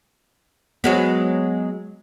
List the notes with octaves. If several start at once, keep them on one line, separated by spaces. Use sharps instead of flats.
F#3 G#3 B3